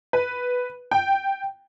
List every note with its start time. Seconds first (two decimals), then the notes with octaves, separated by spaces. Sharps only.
0.13 B4
0.91 G5